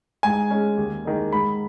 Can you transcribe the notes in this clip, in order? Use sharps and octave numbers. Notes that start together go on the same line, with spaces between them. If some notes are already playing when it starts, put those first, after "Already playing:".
G#2 G#5
G#3 C#4
D#2
D#3 G#3
G#2 B5